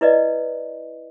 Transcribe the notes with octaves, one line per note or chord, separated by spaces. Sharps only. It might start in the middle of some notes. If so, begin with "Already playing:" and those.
E4 B4 D5 D#5